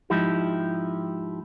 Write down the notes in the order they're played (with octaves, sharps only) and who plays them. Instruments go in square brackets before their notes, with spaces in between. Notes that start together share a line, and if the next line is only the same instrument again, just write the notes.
[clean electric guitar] G#2 F3 D#4 E4 G4